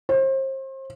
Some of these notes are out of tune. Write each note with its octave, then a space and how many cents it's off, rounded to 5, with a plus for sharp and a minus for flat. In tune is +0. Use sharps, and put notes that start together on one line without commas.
C5 +35